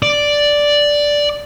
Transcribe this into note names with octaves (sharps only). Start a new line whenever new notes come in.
D5